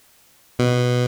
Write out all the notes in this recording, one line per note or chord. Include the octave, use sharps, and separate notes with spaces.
B2